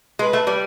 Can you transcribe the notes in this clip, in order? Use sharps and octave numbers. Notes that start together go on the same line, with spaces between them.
G#3 B4
A3
G3